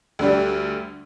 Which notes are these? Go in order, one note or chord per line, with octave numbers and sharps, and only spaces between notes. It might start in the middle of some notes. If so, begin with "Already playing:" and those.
D2 D3 G3 D4